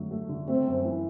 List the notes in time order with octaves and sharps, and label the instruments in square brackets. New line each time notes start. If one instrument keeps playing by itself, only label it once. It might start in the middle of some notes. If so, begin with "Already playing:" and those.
Already playing: [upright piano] D3 F#3 A3
A3
D3
[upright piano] A3 [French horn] C4
[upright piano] F#2
E3